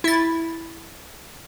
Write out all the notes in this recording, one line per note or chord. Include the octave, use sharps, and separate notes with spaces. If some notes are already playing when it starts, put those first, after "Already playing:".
E4 A6